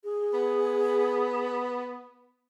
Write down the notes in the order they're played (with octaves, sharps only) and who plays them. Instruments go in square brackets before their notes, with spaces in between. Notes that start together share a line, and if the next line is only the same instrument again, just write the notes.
[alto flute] G#4
[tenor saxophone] B3